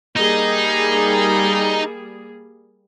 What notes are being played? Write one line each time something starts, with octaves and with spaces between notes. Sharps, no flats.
G3 A#3 D#4 G#4